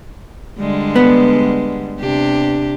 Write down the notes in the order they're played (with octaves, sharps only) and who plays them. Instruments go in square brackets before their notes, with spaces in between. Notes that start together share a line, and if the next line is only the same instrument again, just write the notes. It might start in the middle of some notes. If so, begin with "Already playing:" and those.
[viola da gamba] D3 G3 G#3
[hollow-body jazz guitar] B3
[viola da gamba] C3 D4 G4